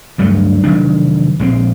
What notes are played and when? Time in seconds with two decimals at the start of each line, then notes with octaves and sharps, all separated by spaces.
0.18 D2 G2 F#3 A3
0.64 F1 D#3 F#3 D4
1.39 A#1 G#3 C4